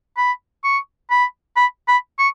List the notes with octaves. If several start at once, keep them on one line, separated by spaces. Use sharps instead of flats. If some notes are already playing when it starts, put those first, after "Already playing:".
B5
C#6
B5
B5
B5
C#6